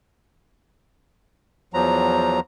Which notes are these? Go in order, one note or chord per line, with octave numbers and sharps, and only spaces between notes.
E2 F3 F#3 A#5